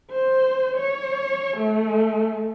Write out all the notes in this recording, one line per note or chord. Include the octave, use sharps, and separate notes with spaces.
C5
C#5
A3